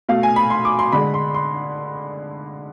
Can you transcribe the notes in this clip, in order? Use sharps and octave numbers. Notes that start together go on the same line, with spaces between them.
B2 A3 F5
G#5
B5
C6
D6
C6
D3 G#3 B5
C6
C6